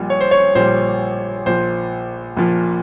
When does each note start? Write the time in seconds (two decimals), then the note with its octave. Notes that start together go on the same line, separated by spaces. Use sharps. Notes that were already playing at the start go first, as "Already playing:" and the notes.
Already playing: A#1 A#2 G3
0.10 C#5
0.21 C5
0.31 C#5
0.55 A#1 A#2 G3 C5
1.46 A#1 A#2 F3 C5
2.37 A#1 A#2 F3